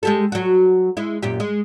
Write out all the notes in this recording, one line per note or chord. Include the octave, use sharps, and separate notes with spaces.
G#3 G4 A4
F#3 F#4
G#3 E4
F#2 A#2 G4
G#3